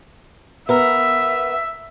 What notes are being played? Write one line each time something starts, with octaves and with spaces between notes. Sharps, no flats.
B3 A#4 E5